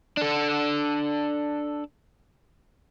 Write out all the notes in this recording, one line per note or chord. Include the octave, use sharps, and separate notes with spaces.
D4 A4